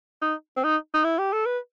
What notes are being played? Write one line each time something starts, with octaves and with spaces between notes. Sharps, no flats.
D#4
C4
D#4
D#4
E4
G4
A4
B4